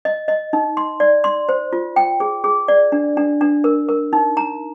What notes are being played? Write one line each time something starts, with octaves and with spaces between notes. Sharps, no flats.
D#5
D#5
D#4
C6
D5
C6
C5
F4
G5
G#4
G#4
D5
D4
D4
D4
A#4
A#4
D#4
A#5